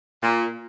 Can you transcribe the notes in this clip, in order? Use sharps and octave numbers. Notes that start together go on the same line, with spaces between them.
A#2